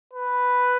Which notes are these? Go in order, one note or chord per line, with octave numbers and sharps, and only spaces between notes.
B4